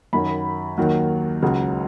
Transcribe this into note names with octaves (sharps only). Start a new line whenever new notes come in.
F#2 D#3 F#3 B5
D#2 D#3 F#3
C#2 C#3 F#3